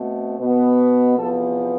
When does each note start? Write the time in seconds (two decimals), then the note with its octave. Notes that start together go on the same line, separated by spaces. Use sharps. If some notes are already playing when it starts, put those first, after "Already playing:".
Already playing: B2 A3 C4
0.38 B2 B3
1.16 E2 C3 F3 B3 A4